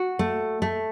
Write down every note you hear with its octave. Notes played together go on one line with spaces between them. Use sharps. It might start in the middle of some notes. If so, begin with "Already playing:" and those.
Already playing: F#4
A3
A3